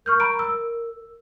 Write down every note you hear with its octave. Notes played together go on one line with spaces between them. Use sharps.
A#4 C#6 F6 G6
A#5 B5 D7
E6